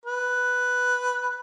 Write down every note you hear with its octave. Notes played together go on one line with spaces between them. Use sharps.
B4